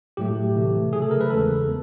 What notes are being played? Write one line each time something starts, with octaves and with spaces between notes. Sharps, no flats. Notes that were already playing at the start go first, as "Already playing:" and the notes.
A2 F#3 A3 G4
C3 E3 A3
C#3 F#3 A3 G#4
A4
A#4
B4
E2 C#3 E3 G#3 A4
B3